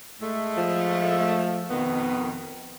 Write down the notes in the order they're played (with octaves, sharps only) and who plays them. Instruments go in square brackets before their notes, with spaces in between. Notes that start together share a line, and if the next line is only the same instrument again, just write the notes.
[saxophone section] A2 G#3 A3
[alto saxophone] F3
[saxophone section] F2 B2 D#3 [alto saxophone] B3